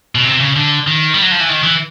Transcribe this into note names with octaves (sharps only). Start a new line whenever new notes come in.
B2
C3
C#3
D3
D#3
G3
F#3
F3
E3
D#3
E3